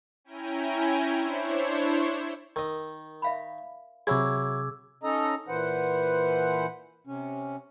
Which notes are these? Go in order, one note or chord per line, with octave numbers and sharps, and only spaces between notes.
C#4 E4 G5 G#5 A#5
D4 E4 C5 C#5
D#3 A#4 D#5
E5 F5 B5
C3 F#3 E4 G#4 D6 E6 G#6
C#4 D#4 A4 D#5 A#5
A#2 E3 B4 C5 F#5
C3 C#4